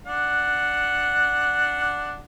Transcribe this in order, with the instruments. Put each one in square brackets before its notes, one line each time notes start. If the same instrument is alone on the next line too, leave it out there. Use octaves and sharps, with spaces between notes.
[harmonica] D4 F#5